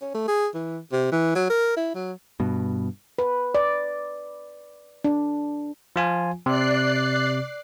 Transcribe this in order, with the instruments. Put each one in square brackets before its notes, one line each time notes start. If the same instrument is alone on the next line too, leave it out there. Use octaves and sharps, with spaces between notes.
[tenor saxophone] C#4
A3
G#4
E3
C3
E3
F#3
A#4
E4
F#3
[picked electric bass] G2 B2
[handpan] B4
D5
D4
[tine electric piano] F3 F4 G#5
[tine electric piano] C3 [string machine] D5 F#6 C7